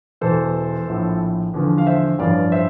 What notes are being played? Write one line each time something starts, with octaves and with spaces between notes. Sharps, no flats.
E1 E2 E3 A4 C5
A#1 A2 F3
E2 D3 F3
F5
C5 E5
A1 G2 F3 D5 F5
C5 E5